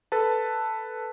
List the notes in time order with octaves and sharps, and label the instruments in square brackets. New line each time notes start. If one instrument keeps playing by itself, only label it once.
[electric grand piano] A4 B4 A5